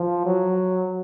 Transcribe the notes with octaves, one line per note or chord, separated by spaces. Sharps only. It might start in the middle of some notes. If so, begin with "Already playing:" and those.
Already playing: F3
F#3